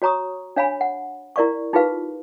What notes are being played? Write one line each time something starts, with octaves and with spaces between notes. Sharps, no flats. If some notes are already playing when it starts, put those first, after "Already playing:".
F#4 C#5 A#5 C#6 D#6
D4 C#5 F5 G#5 B5
F#5
E4 A#4 D5 F5 C#6
D#4 F4 G4 G#4 B4 F5